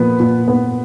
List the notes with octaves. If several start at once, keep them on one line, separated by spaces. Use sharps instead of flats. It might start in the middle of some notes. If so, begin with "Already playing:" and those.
Already playing: A#2 F3 B3 B4
A#2
B3